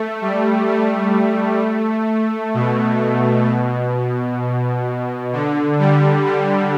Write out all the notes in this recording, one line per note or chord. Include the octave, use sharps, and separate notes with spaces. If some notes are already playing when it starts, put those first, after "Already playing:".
Already playing: A3
G3
A3
B2
B2
D3
G3
G3